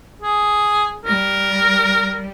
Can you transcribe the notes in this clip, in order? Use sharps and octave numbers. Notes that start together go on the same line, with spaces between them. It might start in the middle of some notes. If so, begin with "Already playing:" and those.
G#4
G3 A#4